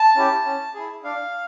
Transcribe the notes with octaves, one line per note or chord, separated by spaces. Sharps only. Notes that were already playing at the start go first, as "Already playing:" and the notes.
Already playing: A5
C#4 E4 G4
C#4
E4 G#4
D4 F5